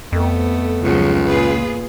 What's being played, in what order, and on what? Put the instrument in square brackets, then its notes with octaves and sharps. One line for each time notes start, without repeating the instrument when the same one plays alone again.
[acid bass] F2 [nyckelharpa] A3 B3
[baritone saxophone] C#2 [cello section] C#3 F3 F#3
[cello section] A#2 F4 G#4 [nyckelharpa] B4